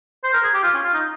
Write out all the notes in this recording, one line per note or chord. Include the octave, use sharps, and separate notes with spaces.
C5
A#4
G#4
G4
F4
C#4
F4
D#4